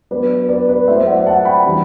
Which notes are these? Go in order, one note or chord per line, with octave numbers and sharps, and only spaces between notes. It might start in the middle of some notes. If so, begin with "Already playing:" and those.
F#3 B3 D4 B4 D5
B4 D5
B4 D5
F#3 A3 E4 C5 E5
D5 F#5
F#5 A5
G5 B5
E3 G3 D4